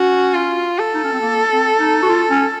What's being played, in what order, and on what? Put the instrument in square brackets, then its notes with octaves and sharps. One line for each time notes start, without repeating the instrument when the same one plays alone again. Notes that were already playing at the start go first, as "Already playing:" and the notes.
Already playing: [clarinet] C#4 [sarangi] F#4
[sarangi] F4
A4
[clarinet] D#4
C#4
C4
A#3
C4
D#4
F#4
F4
C#4